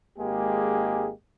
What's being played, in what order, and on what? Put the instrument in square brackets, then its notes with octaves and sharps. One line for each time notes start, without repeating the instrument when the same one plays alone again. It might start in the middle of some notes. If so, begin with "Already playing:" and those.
[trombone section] G#1 G#3 A#3 G4 G#4